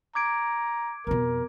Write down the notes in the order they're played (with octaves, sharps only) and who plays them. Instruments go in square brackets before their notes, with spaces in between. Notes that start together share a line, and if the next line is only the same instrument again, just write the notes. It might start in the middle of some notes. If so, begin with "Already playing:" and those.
[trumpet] A#5 [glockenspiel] D6 G#6 D7
[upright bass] F2 B2 [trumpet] A#4